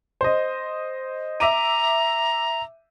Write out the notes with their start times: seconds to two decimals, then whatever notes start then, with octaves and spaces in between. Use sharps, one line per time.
0.21 C5 D#5
1.40 E5 A#5 D6 D#7